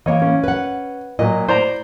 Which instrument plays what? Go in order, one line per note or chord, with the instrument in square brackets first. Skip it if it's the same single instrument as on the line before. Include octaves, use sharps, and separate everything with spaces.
[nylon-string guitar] E3 A#3 [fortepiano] C#5 D#5
[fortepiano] C#4
[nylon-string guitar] B4 F#5
[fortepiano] A#2 F#3 [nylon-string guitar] D#5
[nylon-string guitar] E4 [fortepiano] C5 D5 A#5